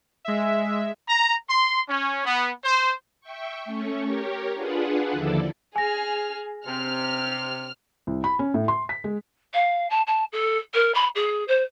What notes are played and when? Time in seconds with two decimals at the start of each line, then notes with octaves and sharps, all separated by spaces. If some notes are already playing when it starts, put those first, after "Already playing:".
0.25 G#3 E5
1.09 A#5
1.49 C6
1.89 C#4
2.25 B3
2.64 C5
3.21 E5 G5 C#6
3.65 A3 C#4 C#5
4.04 G4 A#4 C#5
4.54 D4 F4 G#4 B4 F#5
5.12 D#2 D3 F3 E4 A4 D5
5.76 G#4 G#5 F6 A#6
6.66 C3 F6
8.07 C2
8.24 B5
8.39 C#4
8.54 A2
8.68 C6
8.89 B6
9.04 G#3
9.54 F5
9.90 A5
10.07 A5
10.32 A4
10.74 A#4
10.94 B5
11.15 G#4
11.48 C5